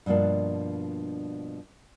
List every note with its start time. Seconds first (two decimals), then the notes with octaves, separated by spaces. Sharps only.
0.06 G2 B2 F3 A#3 D4